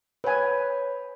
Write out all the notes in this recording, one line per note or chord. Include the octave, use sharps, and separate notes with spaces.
B4 C#5 G#5 B5